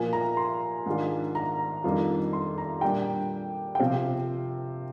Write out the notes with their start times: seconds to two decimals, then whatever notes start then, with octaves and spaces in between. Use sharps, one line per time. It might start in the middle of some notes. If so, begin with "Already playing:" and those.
Already playing: A#2 F3 A#3 G#5
0.13 A#5
0.37 C6
0.86 G#2 D#3 G#3 D4 F4
1.35 A#5
1.84 F2 D#3 G3 D4 F4
2.33 C6
2.58 A#5
2.81 A#2 G3 D4 G5
3.75 G5
3.80 C3 F3 C4 F5